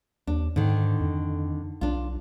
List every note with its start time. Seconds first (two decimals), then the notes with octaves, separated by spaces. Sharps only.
0.27 D#2 D4
0.56 G#2 D3 D#3
1.00 F2
1.81 B1 D4 F4